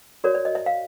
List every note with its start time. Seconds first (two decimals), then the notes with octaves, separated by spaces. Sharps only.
0.24 F#4 A#4 C#5 D5
0.35 D5
0.45 D#5
0.55 E5
0.66 F5